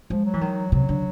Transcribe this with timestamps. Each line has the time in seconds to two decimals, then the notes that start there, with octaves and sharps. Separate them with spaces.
0.09 F3 G#3
0.25 F#3
0.34 E3
0.41 D#3
0.72 C3 F#3
0.89 D3